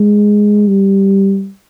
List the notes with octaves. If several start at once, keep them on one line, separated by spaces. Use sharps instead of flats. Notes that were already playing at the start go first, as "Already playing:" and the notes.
Already playing: G#3
G3